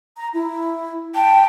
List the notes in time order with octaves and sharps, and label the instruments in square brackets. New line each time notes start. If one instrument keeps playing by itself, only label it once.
[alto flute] A#5
E4
[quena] G5 [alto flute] A5